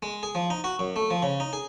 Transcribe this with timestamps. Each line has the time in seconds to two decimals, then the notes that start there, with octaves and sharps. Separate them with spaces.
0.02 G#3
0.23 G#4
0.35 F3
0.50 D#4
0.64 F#4
0.79 F#2
0.96 A3
1.11 F3
1.22 C#3
1.40 D#4
1.53 G#4